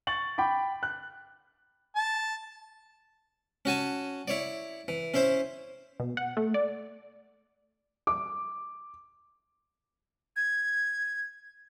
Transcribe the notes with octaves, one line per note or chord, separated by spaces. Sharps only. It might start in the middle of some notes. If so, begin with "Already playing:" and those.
C#6 A6 F#7
G5 B5 D6
F#6
A5
C#4 F#4 G#5 A5
E4 C#5 D5
E3
C#4 E4 C5 E5
B2
F#5
A3
D5
D6
G#6